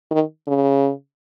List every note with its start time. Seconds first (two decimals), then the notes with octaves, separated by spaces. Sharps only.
0.11 D#3
0.47 C#3